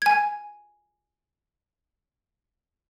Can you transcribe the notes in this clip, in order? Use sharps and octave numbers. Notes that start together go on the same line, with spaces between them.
G#5 G#6